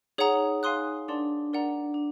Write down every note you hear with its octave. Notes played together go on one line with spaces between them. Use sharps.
D#4 G#4 C#5 F#5 A#5 D#6
F5 G#5 C6 D#6 F#6
D4 A#4 D5 F#5 A5 C6
A#4 D5 F#5 A#5
D4